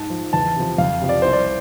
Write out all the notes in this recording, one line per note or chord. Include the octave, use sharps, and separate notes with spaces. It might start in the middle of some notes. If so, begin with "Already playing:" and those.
Already playing: G#2 A5
F3
E2 A5
C3 F3
F2 F5
C3 F3
D5
C2 C5
D5